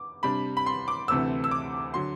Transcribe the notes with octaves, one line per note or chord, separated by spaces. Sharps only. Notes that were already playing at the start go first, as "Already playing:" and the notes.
Already playing: D6
C3 G3 D4 B5
B5
C6
D6
D2 C3 E3 A3 C4 E6
E6
D6
D3 F#3 C6